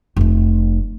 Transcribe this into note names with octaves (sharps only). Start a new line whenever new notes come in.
F1 A3